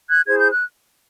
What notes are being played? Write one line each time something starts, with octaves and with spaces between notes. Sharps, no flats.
F#6 G#6
E4 G#4 C5 G#6
G6
F#6